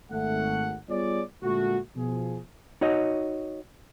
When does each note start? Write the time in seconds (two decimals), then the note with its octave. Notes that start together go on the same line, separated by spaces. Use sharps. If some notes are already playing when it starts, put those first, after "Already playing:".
0.11 G#1 A3 F#5
0.89 G3 B3 F4 G#4 C#5 D5
1.43 A#2 D3 G#3 A3 F#4
1.96 B2 F3 G#4
2.81 D#4 F#4 C#5 D#5